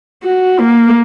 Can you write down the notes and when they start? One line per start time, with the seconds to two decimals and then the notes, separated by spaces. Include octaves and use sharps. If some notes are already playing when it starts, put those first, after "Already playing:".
0.23 F#4
0.59 A#3